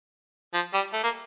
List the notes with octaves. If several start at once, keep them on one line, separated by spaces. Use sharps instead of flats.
F3
G3
A3
A#3